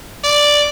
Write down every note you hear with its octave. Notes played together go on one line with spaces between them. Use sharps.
D5